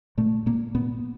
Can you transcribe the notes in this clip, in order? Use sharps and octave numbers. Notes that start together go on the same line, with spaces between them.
A#2 A3
A#2 A#3
A#2 B3